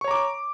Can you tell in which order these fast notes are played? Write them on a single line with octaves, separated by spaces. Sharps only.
C#6 C#5 A#5 D6